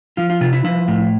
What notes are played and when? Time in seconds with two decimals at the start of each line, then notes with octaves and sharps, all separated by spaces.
0.17 F3 F4
0.30 F4
0.41 C3 F4
0.53 E4
0.64 F3 E4
0.88 A2